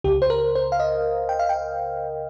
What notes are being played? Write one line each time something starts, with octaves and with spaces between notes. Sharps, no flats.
C#2 C#3 G4
C5
A#4
C5
F5
D#5
G5
F5
G5